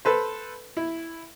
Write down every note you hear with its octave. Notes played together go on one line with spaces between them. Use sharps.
A4 B4 C5
E4